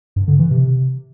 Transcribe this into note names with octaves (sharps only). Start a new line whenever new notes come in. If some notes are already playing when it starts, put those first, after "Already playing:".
G2
D3
E3
C3